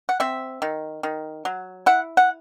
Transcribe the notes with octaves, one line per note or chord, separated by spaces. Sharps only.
F#5
C4 E5
D#3
D#3
F#3
E4 F#5
F#5